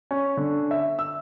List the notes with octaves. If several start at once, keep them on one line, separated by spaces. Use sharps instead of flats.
C#4
D3
E5
E6